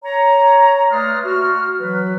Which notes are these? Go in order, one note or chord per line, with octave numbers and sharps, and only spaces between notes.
C#5 A#5
A3 B4 D5 C6 D#6 F6
F#4 F6
E3 F#3 F#4 B4